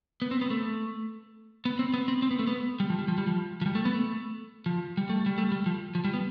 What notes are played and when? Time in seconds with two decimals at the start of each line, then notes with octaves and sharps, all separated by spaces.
0.22 B3
0.31 C4
0.41 B3
0.50 A3
1.65 B3
1.79 C4
1.94 B3
2.08 C4
2.22 C4
2.31 B3
2.39 A3
2.47 B3
2.80 G3
2.90 F3
2.99 G3
3.08 F3
3.18 G3
3.27 F3
3.61 F3
3.66 G3
3.75 A3
3.85 B3
3.94 A3
4.66 F3
4.97 G3
5.09 A3
5.26 G3
5.38 A3
5.52 G3
5.66 F3
5.95 F3
6.04 G3
6.14 B3